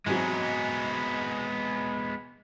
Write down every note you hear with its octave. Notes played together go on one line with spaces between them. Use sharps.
G#2 C3 F#3 G#3 B3